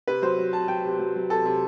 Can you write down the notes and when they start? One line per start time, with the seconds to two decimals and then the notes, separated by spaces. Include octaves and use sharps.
0.08 C3 B4
0.22 F#3 C5
0.38 F#3
0.53 C3 A5
0.68 F#3 G5
0.85 C3
0.99 F#3
1.16 F#3
1.30 C3 A4
1.46 C3